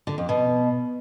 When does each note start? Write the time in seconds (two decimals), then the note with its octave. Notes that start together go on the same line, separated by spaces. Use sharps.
0.07 D3
0.18 F2
0.29 B2